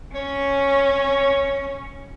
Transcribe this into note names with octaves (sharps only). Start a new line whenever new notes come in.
C#4 C#5